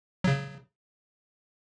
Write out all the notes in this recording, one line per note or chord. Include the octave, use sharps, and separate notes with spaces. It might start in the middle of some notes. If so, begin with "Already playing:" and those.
C#3 F#3